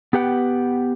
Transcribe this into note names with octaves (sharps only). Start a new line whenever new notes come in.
B3 G4 B4 F#5 G5